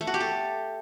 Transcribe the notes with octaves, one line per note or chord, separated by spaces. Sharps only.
A3
F#4
G4
A4